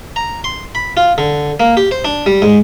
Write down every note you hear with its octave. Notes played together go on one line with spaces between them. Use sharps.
A#5
C6
B5
F4
D3
A#3
G4
C5
D4
G3
G#2